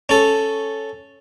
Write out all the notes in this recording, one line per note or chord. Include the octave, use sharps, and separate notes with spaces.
C#4 A4